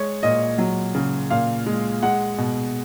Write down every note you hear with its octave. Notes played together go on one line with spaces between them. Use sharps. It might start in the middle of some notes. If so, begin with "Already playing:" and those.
Already playing: G#3 C#5
A#2 D#5
F#3
C#3
A#2 F5
G#3
G#3 F#5
B2